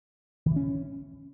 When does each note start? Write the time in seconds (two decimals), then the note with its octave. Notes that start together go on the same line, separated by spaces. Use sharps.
0.46 D#3
0.51 E3
0.56 C#4